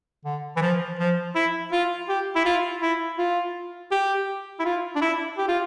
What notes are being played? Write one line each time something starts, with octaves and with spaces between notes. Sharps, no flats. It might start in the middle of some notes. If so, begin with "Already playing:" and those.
D3
E3
F3
F3
E4
F4
G4
E4
F4
E4
F4
G4
E4
F4
D4
E4
G4
F4